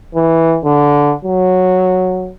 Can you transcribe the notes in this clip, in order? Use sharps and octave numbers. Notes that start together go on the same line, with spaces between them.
E3
D3
F#3